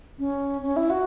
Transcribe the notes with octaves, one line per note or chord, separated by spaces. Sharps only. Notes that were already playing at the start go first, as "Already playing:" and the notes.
C#4
C#4
E4
F#4